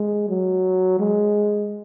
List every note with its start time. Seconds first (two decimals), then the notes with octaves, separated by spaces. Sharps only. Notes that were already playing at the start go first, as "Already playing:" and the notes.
Already playing: G#3
0.29 F#3
1.00 G#3